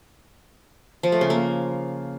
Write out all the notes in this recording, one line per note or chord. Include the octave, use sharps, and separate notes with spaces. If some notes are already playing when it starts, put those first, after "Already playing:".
F3
A3
C#3
A#3